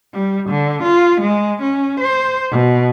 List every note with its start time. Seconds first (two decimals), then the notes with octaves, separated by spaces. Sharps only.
0.14 G3
0.50 D3
0.84 F4
1.21 G#3
1.62 C#4
2.01 C5
2.51 B2